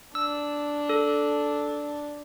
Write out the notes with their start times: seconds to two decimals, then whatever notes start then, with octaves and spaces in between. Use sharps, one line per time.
0.15 D4 E6
0.89 A4